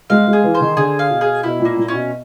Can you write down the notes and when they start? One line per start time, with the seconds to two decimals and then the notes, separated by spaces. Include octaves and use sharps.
0.10 G#3 F5
0.27 G#3
0.33 G#4
0.44 E3
0.55 C5
0.60 D#3
0.76 D3 G#4
0.99 F5
1.10 B2
1.21 G#4
1.43 B2 E4
1.60 A#2
1.65 A#3
1.77 A#2
1.88 B2 C#4